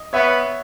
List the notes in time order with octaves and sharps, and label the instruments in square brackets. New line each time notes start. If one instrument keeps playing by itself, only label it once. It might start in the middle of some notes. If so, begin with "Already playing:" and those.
Already playing: [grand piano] D#5
[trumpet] B3 [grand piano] C#5 E5